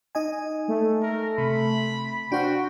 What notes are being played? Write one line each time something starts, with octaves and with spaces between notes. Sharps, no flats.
D#4 D#5 G#5
A3
A#4
C3 B5
D4 F#4 C5 F5 G5